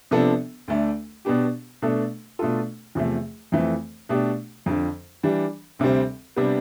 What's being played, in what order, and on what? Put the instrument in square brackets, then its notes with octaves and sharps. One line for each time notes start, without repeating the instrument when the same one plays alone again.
[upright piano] C3 F3 B3 D4 A4
D2 D3 A3 D4
B2 B3 D4 G4
B2 A3 D4 A4
B2 A3 D4 F4 A4
E2 C3 F3 A3
F2 E3 A3 C4
B2 A3 D4 G4
F2 D3 F3
E3 G3 D4
D2 C3 G3 C4
C3 G3 B3 D4